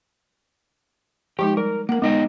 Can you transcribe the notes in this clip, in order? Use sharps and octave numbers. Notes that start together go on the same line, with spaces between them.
F3 G#3 D#4 G4 G5
G3 A#4
A#3 A#4 F#5
G#3 B3 D#4 G5